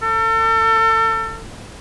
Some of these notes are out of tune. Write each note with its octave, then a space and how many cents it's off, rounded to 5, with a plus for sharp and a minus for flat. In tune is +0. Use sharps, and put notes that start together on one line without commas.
A4 +35